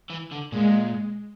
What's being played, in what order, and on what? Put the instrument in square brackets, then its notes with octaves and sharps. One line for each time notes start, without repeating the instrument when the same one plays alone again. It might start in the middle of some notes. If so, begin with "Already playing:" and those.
[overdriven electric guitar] E3
D3
[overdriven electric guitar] A#2 [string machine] G#3